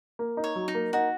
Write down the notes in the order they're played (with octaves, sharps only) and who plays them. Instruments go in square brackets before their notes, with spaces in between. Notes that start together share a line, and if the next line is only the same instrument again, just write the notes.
[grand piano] A#3
D#4
[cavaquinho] C#5
[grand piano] F#3
[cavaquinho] D#4
[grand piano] A#3
[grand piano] D#4 [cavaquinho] F#4